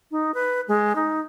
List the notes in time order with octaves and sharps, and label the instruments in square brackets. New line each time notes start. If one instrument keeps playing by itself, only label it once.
[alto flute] D#4
B4
G#3
D#4